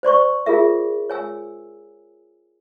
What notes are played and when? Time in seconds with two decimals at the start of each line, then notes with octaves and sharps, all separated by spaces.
0.03 C5 D5 C6 C#6
0.46 F4 G#4 A#4 E5
1.10 C#5 G#5 E6